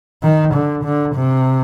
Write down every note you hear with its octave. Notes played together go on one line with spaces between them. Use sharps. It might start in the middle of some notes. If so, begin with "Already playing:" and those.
D#3
D3
D3
C3